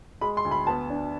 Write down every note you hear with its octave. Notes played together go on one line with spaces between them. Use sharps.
G#3 B5
C6
D2
B5
B3 A5
D4